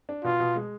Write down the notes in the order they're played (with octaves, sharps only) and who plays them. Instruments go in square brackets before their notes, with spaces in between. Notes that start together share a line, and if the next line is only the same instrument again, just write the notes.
[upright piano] D4
[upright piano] B2 [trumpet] F4
[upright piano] B2
G#3